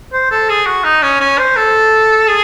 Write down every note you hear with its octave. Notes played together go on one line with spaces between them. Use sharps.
C5
A4
G#4
F#4
D#4
C#4
C#4
C5
A4
G#4